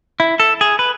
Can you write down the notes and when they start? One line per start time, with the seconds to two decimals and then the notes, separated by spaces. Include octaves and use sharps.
0.20 E4
0.40 A4
0.61 G#4
0.79 B4